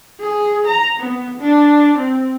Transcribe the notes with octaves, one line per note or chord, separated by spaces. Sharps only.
G#4
A#5
B3
D4
C4